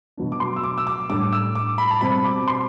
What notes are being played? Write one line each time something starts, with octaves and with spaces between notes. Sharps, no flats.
B2 F#3 B3 D4
D6
C6
E6
D6
E6
D6
A2 G3 D4 D6
E6
D6
B5
A5
B2 G3 C4 B5
D6
C6